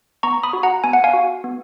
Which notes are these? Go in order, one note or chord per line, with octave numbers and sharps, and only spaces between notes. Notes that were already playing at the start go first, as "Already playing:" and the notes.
B3 A#5 C#6
B5 D#6
F#4
F#5 A#5
B3 G#5
F#5
F5 G#5
F#4
B3